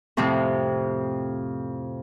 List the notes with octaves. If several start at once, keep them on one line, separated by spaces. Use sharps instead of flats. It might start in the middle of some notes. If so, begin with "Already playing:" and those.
F2 A2 C3 F3